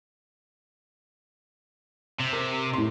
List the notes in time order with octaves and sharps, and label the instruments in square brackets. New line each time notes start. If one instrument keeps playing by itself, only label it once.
[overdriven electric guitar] C3
[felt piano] A#4
A2 C6